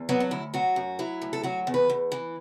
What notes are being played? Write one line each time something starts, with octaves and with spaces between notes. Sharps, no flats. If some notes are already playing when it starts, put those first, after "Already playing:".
Already playing: E2
F#3 B3
D4
D2 E4
F#3 F#4
F#2
F#3 E4
D2
A4
F#3 F#4
E2
B4
E2
E3